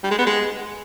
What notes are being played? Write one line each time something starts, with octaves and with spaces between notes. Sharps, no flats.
G3
G#3
B3
G#3